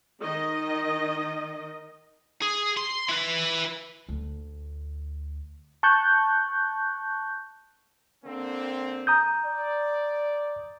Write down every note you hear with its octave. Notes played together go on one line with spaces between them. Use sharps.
D#3 D#5
G#4
C6
E4 B4
D2
A5 C#6 F#6 G6
D3 A#3 C4
A#5 D#6 G6
D5